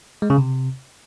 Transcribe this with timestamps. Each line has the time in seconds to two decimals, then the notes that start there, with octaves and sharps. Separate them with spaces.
0.22 G#3
0.30 C#3
0.38 C3